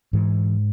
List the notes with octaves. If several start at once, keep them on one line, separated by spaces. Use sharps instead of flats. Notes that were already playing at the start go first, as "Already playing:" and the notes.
G#2 E3